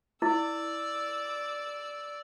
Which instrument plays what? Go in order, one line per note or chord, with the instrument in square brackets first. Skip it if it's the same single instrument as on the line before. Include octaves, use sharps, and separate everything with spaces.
[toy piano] E4 [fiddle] D5 E6